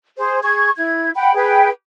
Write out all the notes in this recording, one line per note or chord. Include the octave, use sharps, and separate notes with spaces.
G#4 C5
G#4 C#6 G#6
E4 G#6
F#5 G5 B5
G#4 B4 G5